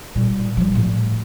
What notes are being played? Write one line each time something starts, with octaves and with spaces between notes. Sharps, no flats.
A#2 G3
F3 G3
A2